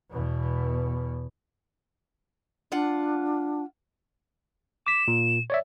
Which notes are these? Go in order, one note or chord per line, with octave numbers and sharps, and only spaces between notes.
E2 B2
D4 F4 F#5
D6 B6 E7
A#2
C#5 D5 E5